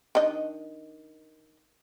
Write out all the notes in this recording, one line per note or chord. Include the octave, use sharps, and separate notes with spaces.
D#3 D4 D#5